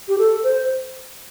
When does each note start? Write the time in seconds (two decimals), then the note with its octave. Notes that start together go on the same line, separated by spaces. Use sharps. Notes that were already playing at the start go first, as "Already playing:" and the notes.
0.08 G4
0.18 A4
0.44 C5